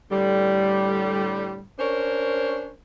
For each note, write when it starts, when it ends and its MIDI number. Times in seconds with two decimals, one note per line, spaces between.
0.11 1.61 45
0.11 1.61 50
0.11 1.61 55
1.79 2.72 61
1.79 2.72 62
1.79 2.72 70
1.79 2.72 72
1.79 2.72 73